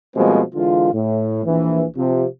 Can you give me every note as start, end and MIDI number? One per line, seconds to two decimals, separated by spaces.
0.16 0.42 47
0.16 0.42 53
0.16 0.42 55
0.16 0.42 56
0.16 0.42 58
0.16 0.42 60
0.54 0.91 50
0.54 0.91 52
0.54 0.91 56
0.54 0.91 65
0.94 1.43 45
1.45 1.84 34
1.45 1.84 52
1.96 2.26 48
1.96 2.26 53